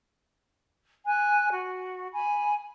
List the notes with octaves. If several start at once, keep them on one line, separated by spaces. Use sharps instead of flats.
G#5 F#6
F#4
G#5 B5